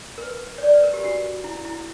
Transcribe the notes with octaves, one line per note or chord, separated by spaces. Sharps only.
A#4
B4
C#5
D5
B4
A#4
G4
F#4
E4
E4